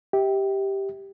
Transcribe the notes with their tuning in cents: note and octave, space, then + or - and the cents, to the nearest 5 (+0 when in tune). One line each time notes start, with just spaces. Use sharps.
G4 +0 E5 -40